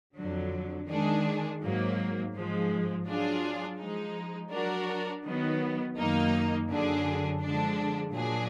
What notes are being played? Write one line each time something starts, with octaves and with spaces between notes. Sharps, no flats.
F2 D3 F#3
D#3 G#3 D4 G#4
G#2 F#3 A#3
G#2 F3 G#3
F#3 D4 F4 G#4
F3 G#3 D#4
F#3 D4 F#4 A#4
D#3 F#3 B3
F#2 D#3 A#3 D#4
F#2 D3 F#3 D4 G#4
D3 F3 G#3 D4
A#2 F#3 D4 G#4